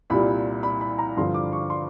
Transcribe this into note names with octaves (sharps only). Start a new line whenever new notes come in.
C2 A#2 G3 B5
B5
B5
A#5
G2 D3 F3 C6
D6
C#6
C6